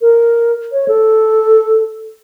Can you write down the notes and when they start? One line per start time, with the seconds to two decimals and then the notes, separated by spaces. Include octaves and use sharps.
0.01 A#4
0.72 C#5
0.88 A4